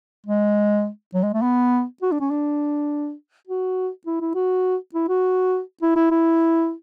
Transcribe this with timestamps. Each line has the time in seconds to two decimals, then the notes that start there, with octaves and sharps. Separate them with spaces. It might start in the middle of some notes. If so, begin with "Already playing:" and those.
0.26 G#3
1.14 F#3
1.23 G#3
1.34 A3
1.42 B3
2.02 F#4
2.12 D4
2.20 C#4
2.30 D4
3.48 F#4
4.06 E4
4.21 E4
4.35 F#4
4.94 E4
5.09 F#4
5.82 E4
5.96 E4
6.11 E4